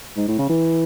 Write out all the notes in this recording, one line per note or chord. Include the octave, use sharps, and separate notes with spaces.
G#2
A2
C#3
E3